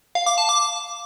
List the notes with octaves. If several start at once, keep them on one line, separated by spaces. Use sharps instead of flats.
F5
D6
A5
D6